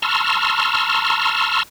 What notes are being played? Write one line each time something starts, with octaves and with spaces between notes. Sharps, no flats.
A5 A#5 C6 C#6 E6 F6